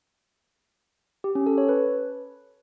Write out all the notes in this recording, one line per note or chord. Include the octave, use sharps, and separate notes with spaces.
G4
C#4
A4
C#5
B4